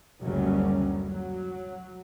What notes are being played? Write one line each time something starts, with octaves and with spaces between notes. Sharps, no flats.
F#1 D2 C#3 F#3 G3 C#4
F#3